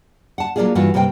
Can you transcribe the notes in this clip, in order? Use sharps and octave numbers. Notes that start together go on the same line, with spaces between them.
F#5 A5
F#3 A#3 C#4 D4 F4 G#4
G2 E3 F4 F#4
G2 C3 A#3 C5 G5